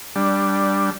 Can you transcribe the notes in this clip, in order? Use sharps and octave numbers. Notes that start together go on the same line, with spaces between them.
G3 D4